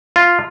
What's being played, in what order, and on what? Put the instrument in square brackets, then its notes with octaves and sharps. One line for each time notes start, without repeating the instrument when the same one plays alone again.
[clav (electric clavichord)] F4